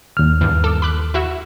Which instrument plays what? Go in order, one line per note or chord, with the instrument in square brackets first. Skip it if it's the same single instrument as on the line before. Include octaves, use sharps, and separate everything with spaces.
[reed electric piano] D#2 F6
[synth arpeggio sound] E2 G2
A4 D6 E6
B5 D6 F#6
E4 F#4 E5